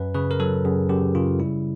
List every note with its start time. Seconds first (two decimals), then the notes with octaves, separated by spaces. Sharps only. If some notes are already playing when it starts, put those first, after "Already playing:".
Already playing: F#2 B4
0.15 C#3 B4
0.31 A#4
0.40 F#3 A4
0.65 F#2 G#4
0.89 F#2 G4
1.15 C#3 F4
1.40 G3 E4